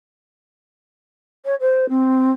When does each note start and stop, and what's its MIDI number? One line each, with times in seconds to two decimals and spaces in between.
1.45 1.55 73
1.60 1.89 72
1.89 2.32 60